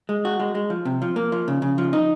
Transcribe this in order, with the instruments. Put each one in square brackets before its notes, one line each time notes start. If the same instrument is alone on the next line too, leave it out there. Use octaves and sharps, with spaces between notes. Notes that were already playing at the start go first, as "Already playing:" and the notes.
[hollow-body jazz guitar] G#3
F#4
G#3
G#3
F3
C3
F3
A#3
F3
C#3
C#3
F3
D#4